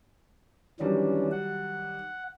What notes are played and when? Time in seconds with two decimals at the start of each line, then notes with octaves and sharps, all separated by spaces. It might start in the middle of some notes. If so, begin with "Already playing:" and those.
0.80 D#3 E3 F#3 G3 C#4 D4
1.31 F#5